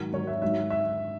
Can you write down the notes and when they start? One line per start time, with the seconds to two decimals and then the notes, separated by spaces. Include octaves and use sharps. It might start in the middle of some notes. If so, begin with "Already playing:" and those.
Already playing: G#2 D#3 F#3
0.13 G#2 D#3 F#3 C#5
0.27 E5
0.42 G#2 F#3 E5
0.70 E5